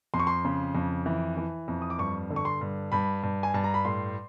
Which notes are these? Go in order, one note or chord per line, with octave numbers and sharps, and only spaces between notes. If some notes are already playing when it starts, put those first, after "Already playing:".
F2 C6
C#6
C6
C#3
F2
E3
E3
F2
D#6
D6
G2 C#6
D3
C#6
C6
G2
G2 B5
G2
G#5
G2 A5
A#5
B5
A2 C6